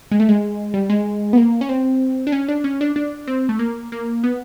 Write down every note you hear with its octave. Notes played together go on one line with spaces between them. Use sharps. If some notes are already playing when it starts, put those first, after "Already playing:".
G#3
A3
G#3
G3
G#3
B3
A#3
C#4
C4
D4
C#4
D4
C#4
D4
D4
C4
A3
A#3
A#3
B3